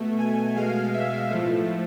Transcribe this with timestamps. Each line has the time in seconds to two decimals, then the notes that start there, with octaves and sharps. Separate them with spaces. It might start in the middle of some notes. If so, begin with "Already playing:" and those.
Already playing: B2 A3
0.18 G#5
0.56 B2 G#3 F5
0.93 E5
1.30 A2 F3 A3